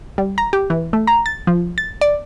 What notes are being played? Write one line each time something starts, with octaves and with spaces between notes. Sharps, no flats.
G3
A#5
G4
E3
A3
A#5
A6
F3
A6
D5